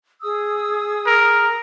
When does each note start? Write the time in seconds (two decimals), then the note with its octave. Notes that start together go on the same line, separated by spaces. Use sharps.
0.22 G#4 D#6 E6
1.06 A#4